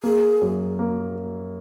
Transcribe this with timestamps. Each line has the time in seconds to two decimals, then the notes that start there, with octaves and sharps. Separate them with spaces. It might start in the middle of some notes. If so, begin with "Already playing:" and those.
0.03 A#3 G#4
0.42 F#2
0.79 A#3